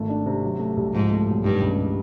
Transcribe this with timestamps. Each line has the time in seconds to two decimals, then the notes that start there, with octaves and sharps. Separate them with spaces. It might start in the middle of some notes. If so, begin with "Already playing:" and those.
Already playing: G#1 A3
0.09 D4
0.26 C3
0.43 F#3
0.59 A3
0.77 C2
0.94 G#2 F3
1.11 A3
1.28 B1
1.44 G2 D#3
1.61 C#2